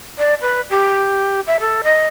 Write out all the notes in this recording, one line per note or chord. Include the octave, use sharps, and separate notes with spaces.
D5
B4
G4
E5
A4
D#5